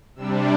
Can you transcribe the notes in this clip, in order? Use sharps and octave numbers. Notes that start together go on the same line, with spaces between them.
C3 G3 D4 E6